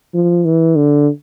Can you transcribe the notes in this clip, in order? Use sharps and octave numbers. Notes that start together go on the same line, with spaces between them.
F3
E3
D3